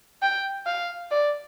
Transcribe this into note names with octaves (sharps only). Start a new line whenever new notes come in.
G5
F5
D5